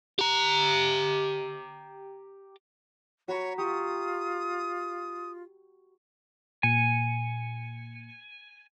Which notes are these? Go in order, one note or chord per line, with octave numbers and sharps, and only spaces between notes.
G4 A#5
F#4 C#5 A#5 B5
F4 G4 C#6 D#6
A#2 G#5 C#7